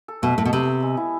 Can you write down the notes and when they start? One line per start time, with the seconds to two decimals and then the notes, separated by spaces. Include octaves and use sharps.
0.08 A4
0.22 B2 A3
0.37 A2 A3
0.45 B2
0.53 C3 B3
0.67 A4
0.82 G#3
0.97 E4